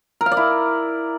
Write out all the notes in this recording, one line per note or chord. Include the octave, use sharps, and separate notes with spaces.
A#4
F5
D5
E4